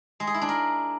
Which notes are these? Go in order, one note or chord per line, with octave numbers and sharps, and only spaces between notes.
G#3
G#4
E4
D4
A#4